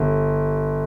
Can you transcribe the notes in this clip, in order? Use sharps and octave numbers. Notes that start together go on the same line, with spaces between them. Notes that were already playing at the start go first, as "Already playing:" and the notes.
Already playing: G1